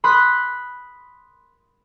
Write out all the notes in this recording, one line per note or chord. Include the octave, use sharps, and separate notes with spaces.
B5 C6 D#6 F#6